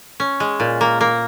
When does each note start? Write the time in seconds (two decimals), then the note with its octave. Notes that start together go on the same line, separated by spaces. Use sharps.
0.20 C#4
0.40 G#3
0.60 A#2
0.81 A#3
1.01 A#3